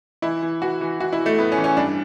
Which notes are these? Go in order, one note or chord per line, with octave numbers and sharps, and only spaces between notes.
E3 E4
E3
E3 F#4
E3
E3 F#4
E4
E3
A3
A2 B3
C#4
E3
C#4
G2 D4